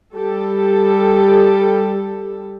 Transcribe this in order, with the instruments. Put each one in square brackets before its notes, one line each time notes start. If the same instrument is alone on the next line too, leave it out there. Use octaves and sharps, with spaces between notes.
[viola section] G3 G4 A4